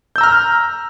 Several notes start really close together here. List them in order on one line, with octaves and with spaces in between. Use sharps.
G6 E6 A#5 F6